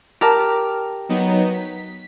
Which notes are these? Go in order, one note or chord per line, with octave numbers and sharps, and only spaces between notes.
G4 A#4 A5
F#3 B3 D#4
B6